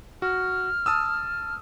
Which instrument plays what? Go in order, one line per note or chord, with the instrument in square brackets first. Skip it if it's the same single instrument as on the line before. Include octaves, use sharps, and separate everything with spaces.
[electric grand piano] F#4 [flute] F6
[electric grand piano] A5 D#6 E6